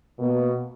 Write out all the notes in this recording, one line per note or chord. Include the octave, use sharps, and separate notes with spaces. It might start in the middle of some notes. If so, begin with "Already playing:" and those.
B2 A#3